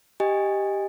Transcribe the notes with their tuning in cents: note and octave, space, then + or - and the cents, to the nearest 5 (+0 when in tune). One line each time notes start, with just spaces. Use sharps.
G4 +0 D#5 +0 G#5 -25